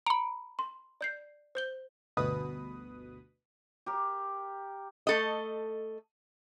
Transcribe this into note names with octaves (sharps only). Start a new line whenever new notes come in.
A#5 B5 C#7 D7
C6
D5 G6 C7
C5 G6 G7
G1 D2 B2 B4 D#6
G4 A#4
A3 A4 D#5